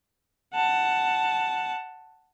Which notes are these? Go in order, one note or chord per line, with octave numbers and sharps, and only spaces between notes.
F#5 A5